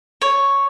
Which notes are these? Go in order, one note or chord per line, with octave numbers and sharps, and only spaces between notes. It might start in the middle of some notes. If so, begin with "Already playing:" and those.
C#5